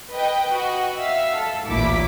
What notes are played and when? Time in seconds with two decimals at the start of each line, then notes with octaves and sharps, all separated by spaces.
0.14 B4 D#5 G5
0.52 F#4 D#5
0.96 E5 F5 E6
1.37 A4
1.66 A1 D2 A#2 E4 D6 B6